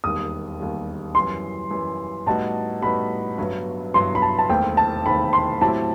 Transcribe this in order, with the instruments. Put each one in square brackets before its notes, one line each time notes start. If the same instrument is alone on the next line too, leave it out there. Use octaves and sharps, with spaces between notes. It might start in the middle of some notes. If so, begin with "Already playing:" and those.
[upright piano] E1 D#2 D#3 G3 [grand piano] D#6
[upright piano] E1 D#2 D#3 G3
[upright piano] F#2 E3 G3 [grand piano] C6
[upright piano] F#2 E3 G3
[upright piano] A2 G3 B3 D#4 F#4 [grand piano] A5
[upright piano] A2 G3 B3 D#4 F#4 [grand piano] B5
[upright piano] G1 G2 F#3 B3
[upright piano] G1 G2 F#3 B3 [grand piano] C6
[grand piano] B5
A5
A5
[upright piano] E1 D#2 D#3 A3 C4 [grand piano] G5
[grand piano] A5
[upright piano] E1 D#2 D#3 A3 C4 [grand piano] B5
[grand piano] C6
[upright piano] A2 F#3 C4 E4 G4 [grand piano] A5